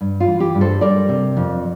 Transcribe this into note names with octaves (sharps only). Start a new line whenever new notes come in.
G2
F4
E3
G4
G2
A4 C5
G3 A#4 D5
C3
F2